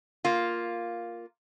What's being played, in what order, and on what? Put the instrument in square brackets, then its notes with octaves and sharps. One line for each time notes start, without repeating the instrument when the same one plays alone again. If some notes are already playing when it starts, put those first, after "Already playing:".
[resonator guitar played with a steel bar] A#3 F4